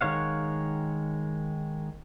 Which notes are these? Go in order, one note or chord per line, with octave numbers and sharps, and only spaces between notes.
D#3 G#3 C#5 F5 F#5